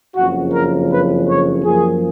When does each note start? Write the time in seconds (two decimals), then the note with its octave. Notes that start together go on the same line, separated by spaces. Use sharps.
0.16 F#1 F2 C#3 F#4
0.53 A#4
0.91 B4
1.28 C#5
1.65 F#2 F3 A#3 G#4